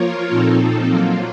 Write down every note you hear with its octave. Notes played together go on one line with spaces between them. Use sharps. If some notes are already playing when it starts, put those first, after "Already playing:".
Already playing: F3 A#3 F4 A#4 C#5
A#2 F3 C4 D#4 A4
F#3 A#3 F4